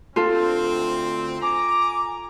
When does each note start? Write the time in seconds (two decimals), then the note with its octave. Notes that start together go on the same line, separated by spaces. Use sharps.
0.16 D2 C4 F4 A4
1.42 G#5 A#5 D6